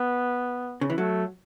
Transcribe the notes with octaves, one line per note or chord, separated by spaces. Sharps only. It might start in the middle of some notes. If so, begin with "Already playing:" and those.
Already playing: B3
C#3
E3
F#3 A3